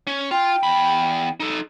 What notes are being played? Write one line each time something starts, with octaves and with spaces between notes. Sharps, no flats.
C#4
F4 G5
E2 B5
D#4 A4